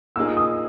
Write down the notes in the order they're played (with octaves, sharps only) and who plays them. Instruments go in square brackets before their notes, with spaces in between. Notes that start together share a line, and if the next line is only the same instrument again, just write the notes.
[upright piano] A#2 A#3 D#4 G#4 [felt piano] E6
[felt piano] D#6